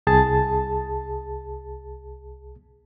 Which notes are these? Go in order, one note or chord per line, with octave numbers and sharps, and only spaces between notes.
C2 G#4 A5 A6